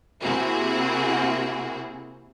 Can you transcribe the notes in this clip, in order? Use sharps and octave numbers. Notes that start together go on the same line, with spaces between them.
C3 A#3 C4 E4 F#4 G#4